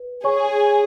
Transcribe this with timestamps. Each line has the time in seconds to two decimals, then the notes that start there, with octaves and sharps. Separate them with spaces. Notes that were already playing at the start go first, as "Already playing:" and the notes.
Already playing: B4
0.24 G#4 C#5 G#5 C#6